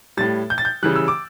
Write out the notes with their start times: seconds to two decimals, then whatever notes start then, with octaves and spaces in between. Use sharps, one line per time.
0.17 A2 G3 A6
0.50 G6
0.58 A6
0.65 G6
0.83 C#3 E3 G3 F#6
0.96 E6
1.08 D6